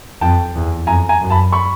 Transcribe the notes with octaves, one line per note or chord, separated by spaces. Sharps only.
F2 G5 A5
E2
F2 G#5 A#5
G#5 A#5
F#2
A5 B5
B5 C#6